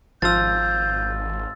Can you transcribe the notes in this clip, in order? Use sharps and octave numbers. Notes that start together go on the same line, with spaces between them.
G#1 F3 F4 E6 G6 A6